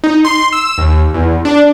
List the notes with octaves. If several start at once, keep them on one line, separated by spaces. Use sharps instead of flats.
D#4
C6
E6
D#2
E2
D4